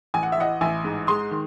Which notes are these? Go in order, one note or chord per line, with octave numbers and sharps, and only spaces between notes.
A1 G#5
F#5
E5
E3 D#5 F#5
A1 E5 G#5
G#2
G#3 C6 D#6
D#3